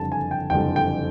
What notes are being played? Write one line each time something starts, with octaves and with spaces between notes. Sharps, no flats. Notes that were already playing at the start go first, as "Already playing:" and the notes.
Already playing: F#1 F2 D3 G3 A5
G#5
G5
F#1 F2 D3 G3 G5
G5